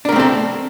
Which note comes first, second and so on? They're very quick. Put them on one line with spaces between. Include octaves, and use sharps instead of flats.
D4 A#4 A3 C4 A4